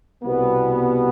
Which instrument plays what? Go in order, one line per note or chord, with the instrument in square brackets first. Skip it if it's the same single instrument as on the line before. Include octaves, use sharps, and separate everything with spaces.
[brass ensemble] C2 B2 G3 B3